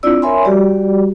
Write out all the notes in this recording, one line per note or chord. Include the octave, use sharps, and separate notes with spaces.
C4 D4 E4 F4 D5 E6
A#4 C#5 E5 G#5 B5 C6
G3 F#4 G4 D5